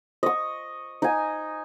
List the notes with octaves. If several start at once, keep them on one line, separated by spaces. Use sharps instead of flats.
D#5 C#6
D#4 G#5